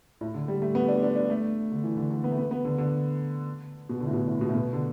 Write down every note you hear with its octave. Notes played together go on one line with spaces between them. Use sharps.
A2
D3
G3
A3
B3
D4
D4
D4
A3
D3
E3
D3
D3
B3
A3
B3
B3
D3
D3
B2
D3
A2
B2
A2
B2
A2
B2
D3